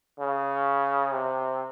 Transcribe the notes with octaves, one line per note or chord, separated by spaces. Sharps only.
C#3
C3